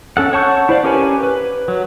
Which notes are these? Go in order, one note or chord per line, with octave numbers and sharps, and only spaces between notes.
C#4 A4 F#5
C#5 F#5 A5 C#6 G6
E4 C5 D5 F5
C#4 G4 A#4 B4 G#5
B4
F#3